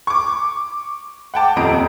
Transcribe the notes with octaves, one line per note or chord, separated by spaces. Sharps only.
C#6 D6
F#5 G5 A5 D6
D#1 F2 D#5 A#5 D7